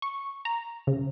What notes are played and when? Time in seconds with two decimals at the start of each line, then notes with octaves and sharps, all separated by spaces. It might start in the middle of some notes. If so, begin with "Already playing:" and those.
0.02 C#6
0.45 A#5
0.87 C#3